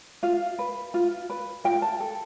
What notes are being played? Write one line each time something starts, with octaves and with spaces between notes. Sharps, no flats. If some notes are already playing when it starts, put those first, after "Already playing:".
F4 F5
B4
F4
B4
F4 G5
A5
A4